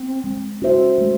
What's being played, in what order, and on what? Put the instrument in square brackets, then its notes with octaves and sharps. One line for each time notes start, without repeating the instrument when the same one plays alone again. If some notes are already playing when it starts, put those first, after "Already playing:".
Already playing: [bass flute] C4
[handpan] G#3
C#4 F#4 C5 E5
[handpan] G#3 [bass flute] A3